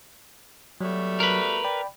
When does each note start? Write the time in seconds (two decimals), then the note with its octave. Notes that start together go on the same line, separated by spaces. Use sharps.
0.81 B2 F#3 G3 A3
1.20 A#4 B4
1.64 D5 G5 B5